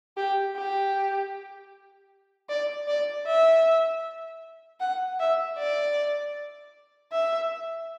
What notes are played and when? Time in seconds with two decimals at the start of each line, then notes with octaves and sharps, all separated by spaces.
0.17 G4
0.56 G4
2.49 D5
2.87 D5
3.27 E5
4.80 F#5
5.20 E5
5.58 D5
7.12 E5